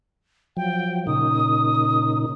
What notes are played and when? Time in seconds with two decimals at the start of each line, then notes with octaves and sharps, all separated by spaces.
0.57 F3 F#3 G5
1.07 A#2 C#3 D#4 D#6